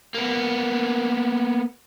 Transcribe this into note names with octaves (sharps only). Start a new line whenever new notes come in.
A#3 B3